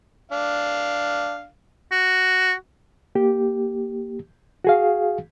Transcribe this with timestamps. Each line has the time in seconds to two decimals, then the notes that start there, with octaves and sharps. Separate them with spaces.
0.32 D4 F5
1.92 F#4
3.15 A#3 G4
4.65 F#4 G#4 F5